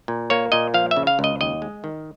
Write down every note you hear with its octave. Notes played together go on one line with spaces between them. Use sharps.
A#2
A#3 C#5
A#2 D#5
F3 F5
E5
C#3
F5
C#2
D#5
D#2 D#5
G#3
D#3